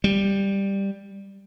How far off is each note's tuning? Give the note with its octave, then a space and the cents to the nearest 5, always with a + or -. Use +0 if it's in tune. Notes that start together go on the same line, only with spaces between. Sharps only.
G3 +5